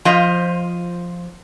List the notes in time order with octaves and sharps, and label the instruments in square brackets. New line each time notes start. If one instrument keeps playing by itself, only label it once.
[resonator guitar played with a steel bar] F3 F4 C5 D#5